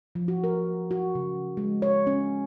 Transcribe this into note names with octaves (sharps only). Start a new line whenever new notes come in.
F3
F#4
A#4
F#4
C#3
G#3
C#5
C#4